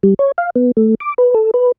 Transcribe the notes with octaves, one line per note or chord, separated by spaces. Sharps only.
G3
C#5
F5
B3
A3
D6
B4
A4
B4